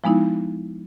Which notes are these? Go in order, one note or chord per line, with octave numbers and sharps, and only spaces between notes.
F3 G#3 B3 D#4 E4